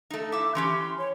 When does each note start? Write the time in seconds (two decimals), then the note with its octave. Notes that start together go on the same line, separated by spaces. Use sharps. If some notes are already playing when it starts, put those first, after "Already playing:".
0.10 A3 D#4
0.32 E4 E5 D6
0.55 E3 C#4 G4 C6
0.98 C#5